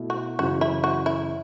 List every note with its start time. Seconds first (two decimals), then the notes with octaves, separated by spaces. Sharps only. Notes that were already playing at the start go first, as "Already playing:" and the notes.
Already playing: B2 A3 E4
0.10 F#4
0.39 F#2 C#3 E3 F#4
0.61 E4
0.84 F#4
1.06 E4